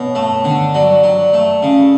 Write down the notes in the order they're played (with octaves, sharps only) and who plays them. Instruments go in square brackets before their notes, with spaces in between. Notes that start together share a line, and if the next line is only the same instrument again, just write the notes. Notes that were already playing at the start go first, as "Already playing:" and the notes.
Already playing: [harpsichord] B2 [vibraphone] C#5
[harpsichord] A3
D3
[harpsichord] F#3 [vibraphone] D5
[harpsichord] F#3
A3
C#3